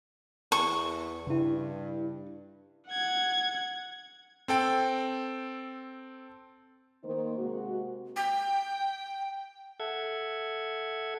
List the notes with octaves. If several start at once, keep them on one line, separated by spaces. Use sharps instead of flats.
E2 C#6
G2 C#3 E4
F#5 G#6
C4 A4 G5
D#3 A#3 D#4 A#4 C5
C3 G#3 A#3 F#4
G5
A4 E5 F#5 G#6